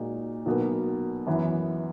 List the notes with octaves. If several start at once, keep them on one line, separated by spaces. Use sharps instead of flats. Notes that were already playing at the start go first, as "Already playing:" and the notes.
Already playing: A#2 G#3 D#4 F#4
B1 B2 A#3
F#2 E3 B3